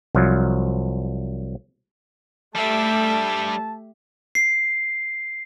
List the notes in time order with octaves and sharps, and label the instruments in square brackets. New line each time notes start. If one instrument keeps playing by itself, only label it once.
[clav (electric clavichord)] C2 F3 F#3
[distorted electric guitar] G3 D4 [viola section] A3 G4 [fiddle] E5 [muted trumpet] A5
[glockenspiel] C7